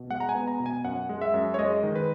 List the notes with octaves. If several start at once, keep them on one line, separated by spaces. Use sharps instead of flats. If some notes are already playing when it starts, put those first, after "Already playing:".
Already playing: B2
G#3 F#5
A#5
G#5
B3
A#5
B2
G#5
F#2 F#5
G#3
E5
F#2
C#5
G#3 D#5
D#3
B4